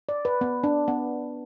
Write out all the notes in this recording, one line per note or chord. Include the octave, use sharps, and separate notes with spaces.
D5
B4
B3
D4
B3